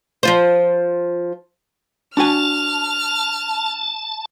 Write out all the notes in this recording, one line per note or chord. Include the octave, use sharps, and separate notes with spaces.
F3 F4 C5
D4 F#4 G#5 A5 F6